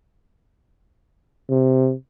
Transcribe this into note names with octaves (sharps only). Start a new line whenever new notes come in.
C3